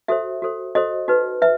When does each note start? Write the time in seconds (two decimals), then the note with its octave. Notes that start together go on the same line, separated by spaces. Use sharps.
0.08 F#4 A4 C5 E5
0.42 F#4 A4 C5
0.75 F#4 A4 C5 D#5
1.08 D#4 F#4 B4
1.42 B4 E5